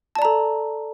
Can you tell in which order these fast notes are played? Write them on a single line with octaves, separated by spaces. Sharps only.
A5 D5 A#5 A4